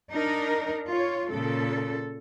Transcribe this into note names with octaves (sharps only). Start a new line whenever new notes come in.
D4 D#4 A#4
F4 C#5
A#2 C#3 A4